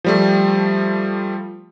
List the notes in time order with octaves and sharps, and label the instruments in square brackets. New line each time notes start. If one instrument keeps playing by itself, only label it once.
[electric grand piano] F3 G3 A3